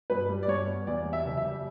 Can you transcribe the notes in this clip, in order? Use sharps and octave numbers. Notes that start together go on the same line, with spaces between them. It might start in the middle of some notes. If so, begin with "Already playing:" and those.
G2 B4
G3
D5
G2 C#5
B3
E2 D5
G3
E5
F#1
E5
G3